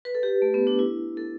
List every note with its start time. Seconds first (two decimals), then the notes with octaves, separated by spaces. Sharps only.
0.05 B4
0.15 A4
0.23 G4
0.42 A3
0.54 B3
0.67 D4
0.79 E4
1.17 A4